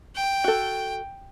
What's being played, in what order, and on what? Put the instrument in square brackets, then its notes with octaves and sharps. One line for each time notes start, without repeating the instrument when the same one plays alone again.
[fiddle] G5
[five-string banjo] F#4 A4